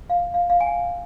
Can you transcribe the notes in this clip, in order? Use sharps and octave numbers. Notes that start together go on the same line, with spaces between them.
F5
F5
F5
G#5
G5